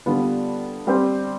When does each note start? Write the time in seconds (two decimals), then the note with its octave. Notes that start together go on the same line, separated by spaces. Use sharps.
0.06 D3 G3 B3 F4
0.87 G3 C4 G4 C5